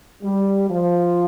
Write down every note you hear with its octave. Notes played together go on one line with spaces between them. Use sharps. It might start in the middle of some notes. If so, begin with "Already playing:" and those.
G3
F3